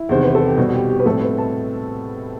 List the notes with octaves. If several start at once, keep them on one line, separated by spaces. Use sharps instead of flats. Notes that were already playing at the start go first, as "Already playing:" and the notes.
Already playing: E4
E2 C3 D#3 C5
B4
A4
G4
B2 G3 C4 F#4
F#4
G4
G4
B4
A2 G3 C4 A4
B4
A5